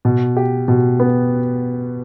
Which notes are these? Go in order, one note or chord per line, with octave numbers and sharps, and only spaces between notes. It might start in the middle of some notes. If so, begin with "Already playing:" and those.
B2
G4
B2
B3